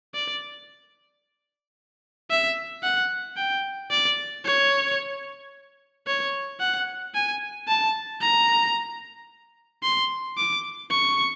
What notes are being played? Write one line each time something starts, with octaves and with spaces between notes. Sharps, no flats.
D5
E5
F#5
G5
D5
C#5
C#5
F#5
G#5
A5
A#5
C6
D6
C#6